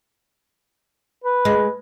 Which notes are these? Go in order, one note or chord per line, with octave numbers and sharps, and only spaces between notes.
B4
G#3